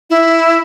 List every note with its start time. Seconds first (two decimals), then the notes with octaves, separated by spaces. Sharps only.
0.10 E4